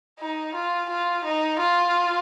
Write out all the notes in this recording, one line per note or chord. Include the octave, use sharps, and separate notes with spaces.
D#4
F4
F4
D#4
F4